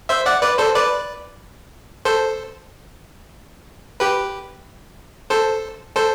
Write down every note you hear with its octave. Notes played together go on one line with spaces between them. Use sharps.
C5 E5
D5 F#5
B4 D5
A4 C5
B4 D5
A4 C5
G4 B4
A4 C5
A4 C5